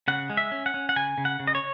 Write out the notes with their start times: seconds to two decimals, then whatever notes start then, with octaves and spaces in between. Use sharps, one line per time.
0.08 C#3 F#5
0.30 G#3
0.37 E5
0.52 C#4
0.66 F#5
0.74 C#4
0.89 F#5
0.96 C#3 G#5
1.18 C#3
1.25 F#5
1.40 C#3
1.47 D#5
1.55 C#5